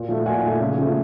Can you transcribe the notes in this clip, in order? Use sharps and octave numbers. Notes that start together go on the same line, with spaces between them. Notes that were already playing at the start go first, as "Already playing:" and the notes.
Already playing: A#2
F3 A3
A#2 F#5 G#5
F3 A3
C#3
F3 A3